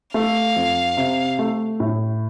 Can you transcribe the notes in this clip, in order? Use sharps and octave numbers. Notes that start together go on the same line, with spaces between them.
A3 F5
F2
C3
A3
A2